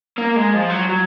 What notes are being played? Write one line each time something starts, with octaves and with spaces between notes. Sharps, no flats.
A#3
G#3
F3
F#3
F#3